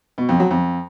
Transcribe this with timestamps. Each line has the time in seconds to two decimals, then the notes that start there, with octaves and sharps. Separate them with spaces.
0.18 B2
0.29 F2
0.40 F#3
0.51 F2